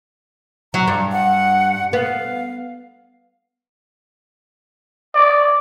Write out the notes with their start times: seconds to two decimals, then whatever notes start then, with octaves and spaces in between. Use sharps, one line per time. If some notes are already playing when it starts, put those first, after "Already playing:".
0.74 F#3 A#5
0.88 G2
1.12 F#5
1.93 B3 F5
5.14 D5